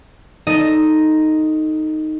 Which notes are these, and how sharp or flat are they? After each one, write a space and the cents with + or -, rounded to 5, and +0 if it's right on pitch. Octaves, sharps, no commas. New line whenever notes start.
D#4 +0 A4 +0 D#5 +0